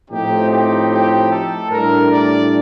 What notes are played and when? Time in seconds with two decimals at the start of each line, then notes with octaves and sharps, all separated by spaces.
0.11 A2 F3 C4 D#4 G4
0.51 G4
0.91 G4
1.31 A4
1.70 A2 G3 D4 A#4
2.11 D5